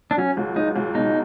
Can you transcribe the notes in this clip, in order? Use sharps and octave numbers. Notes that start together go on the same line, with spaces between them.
D4
F#3 C#4
C#2
C#2 D#4
C#2
B2 D#4